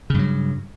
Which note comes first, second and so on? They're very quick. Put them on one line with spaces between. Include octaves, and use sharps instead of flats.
C#3 G2 F#3